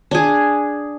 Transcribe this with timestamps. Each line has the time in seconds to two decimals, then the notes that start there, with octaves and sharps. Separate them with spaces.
0.11 D4 G#4